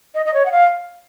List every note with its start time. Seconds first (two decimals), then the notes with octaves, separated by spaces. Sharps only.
0.15 D#5
0.26 D#5
0.34 C#5
0.46 F#5
0.52 F5